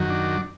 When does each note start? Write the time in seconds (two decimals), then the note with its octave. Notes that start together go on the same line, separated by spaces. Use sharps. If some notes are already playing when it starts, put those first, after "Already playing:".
Already playing: F#2 D#3 F#3
0.10 D4